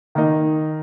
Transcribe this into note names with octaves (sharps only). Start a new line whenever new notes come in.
D#3 A#3 D#4